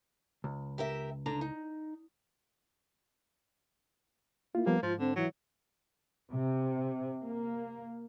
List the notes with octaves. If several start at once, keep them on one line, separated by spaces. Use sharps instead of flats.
C#2
G4 A#4 E5
D3 D4 A#5
D#4
A#3 E4 F4
F3 G3 A#3 B3
G#2 F3 F4
D3 C4
E3 F#3
C3
A#3